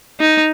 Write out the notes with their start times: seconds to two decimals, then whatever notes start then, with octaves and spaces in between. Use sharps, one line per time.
0.20 D#4